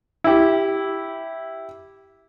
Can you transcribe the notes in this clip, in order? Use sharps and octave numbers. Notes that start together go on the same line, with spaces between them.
E4 G4